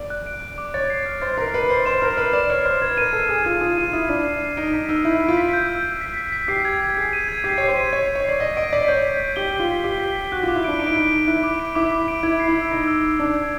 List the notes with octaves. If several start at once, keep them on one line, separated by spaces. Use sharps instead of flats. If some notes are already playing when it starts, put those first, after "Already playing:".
Already playing: D5
F#6
D7
F#6
D6
C#5 A6
C7
F6
C5 A6
A#4 C7
B4 C7
C5 C7
C5 E7
A#4 F6
B4 C7
D5 E7
C#5 F6
C5 C7
B4 G#6
A#4 D#7
A4 C7
G#4 C7
F4 G#6
F4 D#6
F4 D#7
E4 D#6
D4 C7
C7
C7
D#4 D7
D#4 B6
D#4 E6
E4 G6
D7
F4
B6
G6
E6
G6
B6
B6
B6
G4 C7
G#6
G#6
G#4 C7
D#7
G#6
G4 C7
C#5 C7
C5
D#7
C#5 G#6
C7
C#5
D5 C7
D#5 B6
D#5 D7
D5 B6
C#5 G6
B6
G6
G4 G7
G6
F4
G7
G4 G7
B6
B6
F#4 F#6
F4 D6
E4
D4 D7
D#4 D7
E4
D#4 D7
D7
E4 F#6
D6
D7
E4 D6
D6
D7
E4 G#6
C7
E4
E6
D#4 C7
E6
E6
D4 C7
G#6